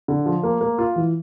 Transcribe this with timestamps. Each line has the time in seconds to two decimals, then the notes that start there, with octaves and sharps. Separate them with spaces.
0.08 D3
0.26 F3
0.43 A#3
0.61 A#3
0.78 F4
0.96 E3